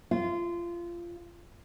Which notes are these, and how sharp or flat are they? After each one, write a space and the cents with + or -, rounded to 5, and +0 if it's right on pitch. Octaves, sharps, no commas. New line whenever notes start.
F4 -20